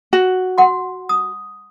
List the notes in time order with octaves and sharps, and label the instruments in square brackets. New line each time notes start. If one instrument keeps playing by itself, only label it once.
[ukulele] F#4
[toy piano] F#5 C6
D#6